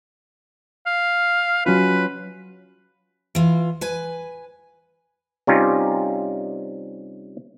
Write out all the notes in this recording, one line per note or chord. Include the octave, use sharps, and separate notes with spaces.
F5
F#3 C#4 F4 B4
E3 F4
B4 G#5
C3 G3 C#4 D#4 F4